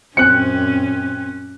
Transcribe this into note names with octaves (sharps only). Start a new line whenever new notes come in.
F#2 A#2 C4 C#4 F#6 C#7